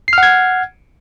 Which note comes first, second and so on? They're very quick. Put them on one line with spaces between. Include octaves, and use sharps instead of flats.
C7 F6 F#5 G#6